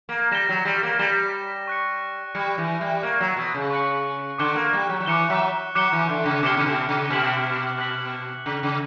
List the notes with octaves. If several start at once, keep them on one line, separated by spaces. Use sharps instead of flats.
A#3
G3 A#6 E7 G7
F#3
G3
A#3
G3 A#6 E7 G7
C#6 F#6 C#7
G3 C#6 F#6 C#7
E3
G3
A#3 C#6 F#6 C#7
F#3
B2
C#3
C#6 F#6 C#7
D3 D6 F#6 C#7 E7 G7
A#3
G3
F#3
F#3
E3 D6 F#6 C#7 E7 G7
F#3
F#3 D6 F#6 C#7 E7 G7
E3
D3
C#3
B2 D6 F#6 C#7 E7 G7
C#3
B2
C#3
B2 F#6 B6 F#7
F#6 B6 F#7
C#3 F#6 B6 F#7
C#3